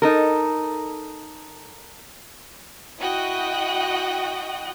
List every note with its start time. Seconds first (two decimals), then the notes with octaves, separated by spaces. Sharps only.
0.02 D#4 A4 A#4
2.99 E4 F#4 D#5 G5 D#6 F#6